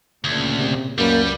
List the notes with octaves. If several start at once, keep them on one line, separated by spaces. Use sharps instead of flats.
D2 A#2 C#3
C3
C#2 F#2 G3 A#3 B4